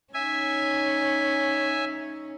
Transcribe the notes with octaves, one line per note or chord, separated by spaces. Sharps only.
C#4 D#4 C#5 E5 G#5